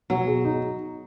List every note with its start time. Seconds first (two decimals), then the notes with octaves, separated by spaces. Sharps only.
0.10 B2 F#3
0.27 G#4
0.45 D#4